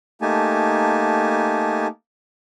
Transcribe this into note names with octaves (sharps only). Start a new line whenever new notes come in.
A3 A#3 D#4 G4 G#5 A5